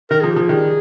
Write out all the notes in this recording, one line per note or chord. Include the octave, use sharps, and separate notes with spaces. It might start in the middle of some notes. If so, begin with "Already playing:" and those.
D#3 A#4
F3 G#4
G4
F3
G#4
D#3 G3